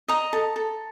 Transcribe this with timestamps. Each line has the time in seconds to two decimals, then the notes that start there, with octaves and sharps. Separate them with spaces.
0.08 D#5 A#5
0.33 A4
0.56 A4